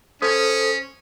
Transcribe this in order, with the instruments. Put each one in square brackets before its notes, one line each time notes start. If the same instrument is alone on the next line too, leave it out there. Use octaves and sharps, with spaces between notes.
[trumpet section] C#4 [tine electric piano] A4 C5 D#6